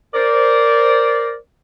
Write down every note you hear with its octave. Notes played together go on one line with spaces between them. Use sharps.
A#4 C5 D5